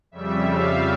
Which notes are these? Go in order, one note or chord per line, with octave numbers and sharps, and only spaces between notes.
F2 C#3 G3 E5
F5